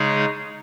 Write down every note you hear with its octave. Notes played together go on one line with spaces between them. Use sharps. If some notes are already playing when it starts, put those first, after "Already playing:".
Already playing: C#3 G#3 D#4 G#4 C#5